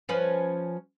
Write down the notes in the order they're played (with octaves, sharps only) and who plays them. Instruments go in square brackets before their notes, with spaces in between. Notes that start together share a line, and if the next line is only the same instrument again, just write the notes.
[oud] F3 C#4 B4